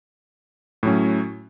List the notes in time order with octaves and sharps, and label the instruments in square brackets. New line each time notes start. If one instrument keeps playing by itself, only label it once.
[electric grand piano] A2 F#3 C#4